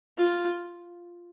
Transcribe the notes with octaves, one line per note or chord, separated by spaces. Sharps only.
F4